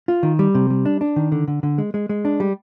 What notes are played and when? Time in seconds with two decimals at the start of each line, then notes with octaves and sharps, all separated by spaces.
0.08 F4
0.23 D#3
0.39 G3
0.55 C3
0.70 G3
0.85 D4
1.01 D4
1.16 D#3
1.32 D3
1.48 D3
1.63 D3
1.78 G#3
1.94 G#3
2.09 G#3
2.25 D4
2.40 G3